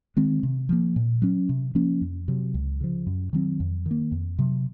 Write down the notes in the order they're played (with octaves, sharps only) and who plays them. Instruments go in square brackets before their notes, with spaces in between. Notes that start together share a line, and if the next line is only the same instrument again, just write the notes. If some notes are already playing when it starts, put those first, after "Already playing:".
[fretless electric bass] D#3 G#3 C4
C3
F3 A#3
A#2
F#3 C#4
C3
F3 A#3 C#4
F2
C3 F#3
C#2
C#3 F3
F#2
D#3 F#3 C4
F2
D#3
A#3
F2
C3 F#3